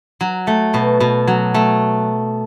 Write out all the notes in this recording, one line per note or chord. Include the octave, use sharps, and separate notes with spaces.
F#3
A3
B2
B2
F#3
A3